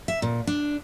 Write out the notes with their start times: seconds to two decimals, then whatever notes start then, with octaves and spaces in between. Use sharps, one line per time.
0.08 E5
0.22 A#2
0.47 D4